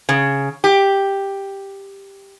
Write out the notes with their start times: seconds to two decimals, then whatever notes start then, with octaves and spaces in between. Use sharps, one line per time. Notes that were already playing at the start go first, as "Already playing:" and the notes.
0.09 C#3
0.64 G4